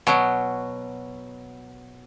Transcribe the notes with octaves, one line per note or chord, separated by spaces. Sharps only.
B2 F#3